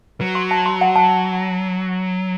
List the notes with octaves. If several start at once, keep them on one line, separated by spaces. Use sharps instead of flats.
F#3 B4
C6
A5
C6
F#5
A5